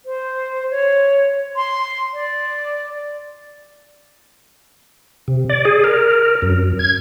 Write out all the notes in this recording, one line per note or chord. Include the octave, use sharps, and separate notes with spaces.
C5
C#5
C6
D5
C3
D5
G#4
A#4
F#2
G#6